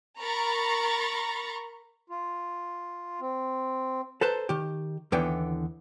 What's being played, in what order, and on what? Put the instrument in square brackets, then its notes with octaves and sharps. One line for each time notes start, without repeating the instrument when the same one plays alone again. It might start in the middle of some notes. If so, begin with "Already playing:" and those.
[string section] A#4 A#5 B5 C#6 A6
[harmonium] F4
C4
[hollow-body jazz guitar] A4 B4 C5 A5 A#5
D#3 G4
D#2 D3 E3 B3 E4 G5